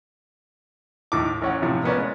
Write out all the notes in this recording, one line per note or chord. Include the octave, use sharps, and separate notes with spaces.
D#2 A2 D6
A1 C#4 F#5
A#1 F2 A2 C3
A#3 B3 C#4 D5
G#3